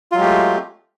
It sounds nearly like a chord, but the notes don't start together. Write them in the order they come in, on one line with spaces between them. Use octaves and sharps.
F4 F#3 G#3 G4 A3